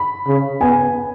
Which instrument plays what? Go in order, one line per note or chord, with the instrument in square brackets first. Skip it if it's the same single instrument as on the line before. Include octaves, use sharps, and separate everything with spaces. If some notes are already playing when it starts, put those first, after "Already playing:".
Already playing: [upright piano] B5
[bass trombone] C#3
[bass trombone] B3 [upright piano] G#5